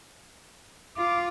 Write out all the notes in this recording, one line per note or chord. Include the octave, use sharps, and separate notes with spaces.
F4 D6